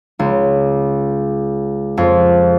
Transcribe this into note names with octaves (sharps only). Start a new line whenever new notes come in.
C#2
F2